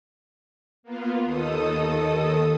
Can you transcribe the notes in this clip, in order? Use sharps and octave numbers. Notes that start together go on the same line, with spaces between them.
A#3 B3 F4
D#2 D#3 A4 D#6